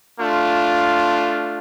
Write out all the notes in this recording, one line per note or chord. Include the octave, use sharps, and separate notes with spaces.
A3 D4 F4